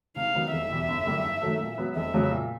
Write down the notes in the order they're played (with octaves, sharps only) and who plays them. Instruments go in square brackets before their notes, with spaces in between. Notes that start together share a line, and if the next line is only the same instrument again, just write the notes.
[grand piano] C3 [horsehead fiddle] F5
[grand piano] D#3 F#3 B3
[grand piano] F1 [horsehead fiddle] E5
[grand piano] E2 B2 G3
G1
F#2 D3 G3 A#3
G2
D#3 F#3 A3
A#2
F#3 B3
[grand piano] F1 [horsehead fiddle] E5
[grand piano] F2 C#3 F#3
A#2